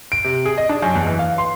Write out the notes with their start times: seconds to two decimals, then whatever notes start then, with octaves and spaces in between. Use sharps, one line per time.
0.12 D7
0.24 C3
0.46 G#4
0.58 D#5
0.69 D4
0.82 F#2
0.95 E2
1.07 E3
1.19 F5
1.38 C6